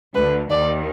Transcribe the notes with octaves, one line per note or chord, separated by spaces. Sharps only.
D2 D3 B4
D#2 D#3 D5